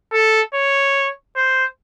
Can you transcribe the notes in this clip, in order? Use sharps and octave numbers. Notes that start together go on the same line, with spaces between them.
A4
C#5
C5